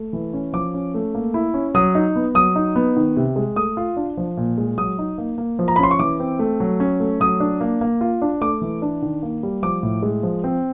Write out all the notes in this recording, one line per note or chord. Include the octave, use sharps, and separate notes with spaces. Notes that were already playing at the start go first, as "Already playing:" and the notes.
Already playing: A3
E3
C#4
F3 D6
C#4
A3
A#3
E4
C#4
F#3 D#6
D#4
B3
F#3 D#6
D#4
B3
D#3
C3
G#3
A3 D#6
F4
D4
F3
A#2
G#3
F#3 D#6
D#4
A#3
A#3
F3
A#5
B5
C#4 C6
C#6
E3 D6
C4
A3
F#3
C#4
A3
F#3 D#6
D4
A#3
A#3
F4
D4
A3 D6
E3
D4
D#3
A#3
G3
F3 D6
A2
G#3
F3
C4